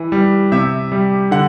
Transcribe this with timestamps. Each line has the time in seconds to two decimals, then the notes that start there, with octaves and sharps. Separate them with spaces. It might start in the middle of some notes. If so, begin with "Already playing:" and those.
Already playing: E3
0.12 G3
0.52 C3 E5
0.92 G3
1.31 D3 F#5